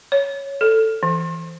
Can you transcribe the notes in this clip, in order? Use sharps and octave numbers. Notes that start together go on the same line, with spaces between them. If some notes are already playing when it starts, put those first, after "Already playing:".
C#5
A4
E3